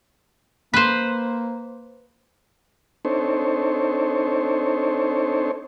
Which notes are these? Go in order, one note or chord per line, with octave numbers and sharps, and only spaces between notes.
A#3 B4 C5
C4 D4 D#4 A4 C5 C#5